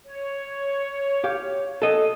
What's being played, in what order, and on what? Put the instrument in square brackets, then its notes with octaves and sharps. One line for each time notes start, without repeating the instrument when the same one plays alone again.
[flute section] C#5
[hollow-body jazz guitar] G4 F5
A4 D#5